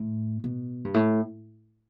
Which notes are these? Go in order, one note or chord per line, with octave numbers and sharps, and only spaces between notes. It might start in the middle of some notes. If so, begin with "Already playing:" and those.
Already playing: A2
B2
G2
A2